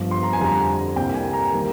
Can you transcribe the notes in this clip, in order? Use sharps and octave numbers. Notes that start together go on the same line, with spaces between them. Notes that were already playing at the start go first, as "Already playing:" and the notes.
Already playing: G1 G2 F3
C6
A#5
G#5
F2 D3 G3 A#5
C2 C3 G3 A#3 G5
G#5
A#5
D#3 G3 A#3